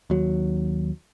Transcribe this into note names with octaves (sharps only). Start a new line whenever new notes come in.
D#2 F#3